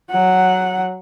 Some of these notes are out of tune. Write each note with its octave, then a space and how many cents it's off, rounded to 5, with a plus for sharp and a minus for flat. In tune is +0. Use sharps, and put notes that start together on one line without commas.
F#3 +0 F#5 +0